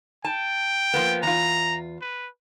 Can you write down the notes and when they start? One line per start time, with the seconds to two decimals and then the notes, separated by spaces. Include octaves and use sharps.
0.25 G5 A5
0.94 F3 A#3 B3
1.23 E2 F4 A#5
2.01 B4